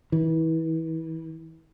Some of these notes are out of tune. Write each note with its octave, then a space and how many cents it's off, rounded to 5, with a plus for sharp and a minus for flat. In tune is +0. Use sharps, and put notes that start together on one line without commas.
E3 -30